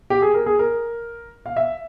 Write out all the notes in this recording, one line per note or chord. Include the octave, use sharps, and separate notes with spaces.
G4
G#4
A#4
G#4
A#4
F5
E5